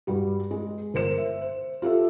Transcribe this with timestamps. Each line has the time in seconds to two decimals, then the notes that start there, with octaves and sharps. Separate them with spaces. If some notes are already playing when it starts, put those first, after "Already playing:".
0.07 G2 G3 F#4 G4
0.51 G#3
0.94 G1 A#4 C5 C#7 E7
1.18 E5
1.42 C5
1.82 F4 G4 A4 E5